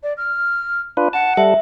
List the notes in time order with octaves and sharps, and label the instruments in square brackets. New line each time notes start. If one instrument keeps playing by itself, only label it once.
[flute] D5
F6
[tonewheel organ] D4 F4 B4
[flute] F#5 [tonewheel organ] A5
[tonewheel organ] G3 A4 [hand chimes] E5